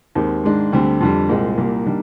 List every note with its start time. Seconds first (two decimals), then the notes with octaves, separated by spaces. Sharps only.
0.15 D#2 D#3 G#3 C4 G4
0.44 G#2 D#3 G#3 D4
0.72 D2 D3 G3 C4
1.00 F2 D3 G3
1.29 C2 A#2 G#3 C4
1.58 C2 A#2 G3 A#3
1.86 D#3 G3 A#3 D4